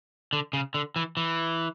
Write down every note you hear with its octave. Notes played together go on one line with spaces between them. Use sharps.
D3
C#3
D3
E3
E3